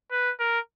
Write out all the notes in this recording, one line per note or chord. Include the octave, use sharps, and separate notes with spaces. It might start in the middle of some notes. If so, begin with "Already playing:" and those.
B4
A#4